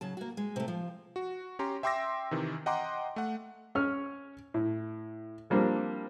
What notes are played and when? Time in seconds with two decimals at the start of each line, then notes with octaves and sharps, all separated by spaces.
0.01 C#3 F#3 A5
0.17 A#3 F#4
0.37 G#3
0.56 C3 A3
0.68 F3
1.16 F#4
1.59 C#4 G4 A#5 C6
1.83 E5 G5 C6 D6 E6 A#6
2.31 C3 D#3 E3
2.66 D#5 F#5 G5 A#5 C6 D6
3.16 A3 F#5
3.75 C#4 C#5 F6
4.54 A2
5.50 F3 G3 A#3 C4 D4